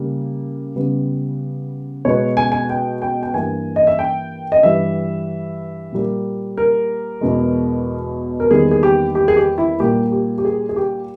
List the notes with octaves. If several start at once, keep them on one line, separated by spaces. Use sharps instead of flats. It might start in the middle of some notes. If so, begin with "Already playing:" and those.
Already playing: C#3 G3 A#3
C#3 G3 B3
B2 G#3 B3 C#5
G#5
G#5
G5
G5
G5
G2 E3 A#3 G#5
D#5
E5
G5
D#5
G2 E3 G3 E5
A#2 G3 A#3
A#4
E2 B2 G#3
A#4
E2 D#3 G3 A#3 G#4
G#4
G4
G4
G#4
G4
E4
A#2 G3 A#3 G4
G4
G4
G#4
G#4
G4